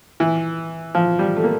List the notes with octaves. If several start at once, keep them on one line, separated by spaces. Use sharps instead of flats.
E3
F3
G3
A3
A#3